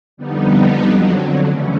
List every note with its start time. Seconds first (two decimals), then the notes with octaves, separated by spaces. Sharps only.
0.17 F2 D3 G3 B3 D#4
0.81 F2 D3 F#3
1.46 C#3 E3 A3 C#4